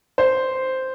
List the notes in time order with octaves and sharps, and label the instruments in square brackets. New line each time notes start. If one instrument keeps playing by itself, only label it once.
[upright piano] C5